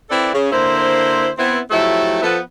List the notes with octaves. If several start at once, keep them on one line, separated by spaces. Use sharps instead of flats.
C4 E4 A4 B4 D5
C#3
D3 A#3 E4 C5
B3 C4 E4
F3 F#3 A3 E4 G4 A4
F3 B3 A4